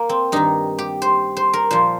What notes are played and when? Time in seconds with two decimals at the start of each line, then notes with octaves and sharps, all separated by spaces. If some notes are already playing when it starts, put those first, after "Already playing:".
Already playing: A#3
0.09 C4
0.32 G2 D#3 D#4
0.78 G4
1.02 C5
1.37 C5
1.53 A#4
1.71 A#2 F3 C5